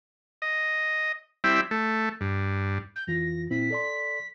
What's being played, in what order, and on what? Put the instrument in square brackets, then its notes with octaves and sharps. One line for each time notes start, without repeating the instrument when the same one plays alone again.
[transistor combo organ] D#5
G3 C4 E4 E5
A3
G2
[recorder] G6
[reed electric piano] F2 E3 F4 [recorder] A#6
[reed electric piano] A#2 C4 E4 [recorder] B6
[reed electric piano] A4 D5 C6